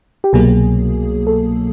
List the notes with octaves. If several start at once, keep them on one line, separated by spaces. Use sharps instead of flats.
G4
C2 B2 F#3 A#3 G#4
A4